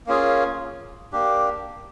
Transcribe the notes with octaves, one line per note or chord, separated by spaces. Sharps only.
A#3 C#4 F4 G#4
A#3 D4 G4